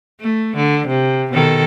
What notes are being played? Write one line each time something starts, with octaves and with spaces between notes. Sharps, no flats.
A3
D3
C3
B2 D#3 A4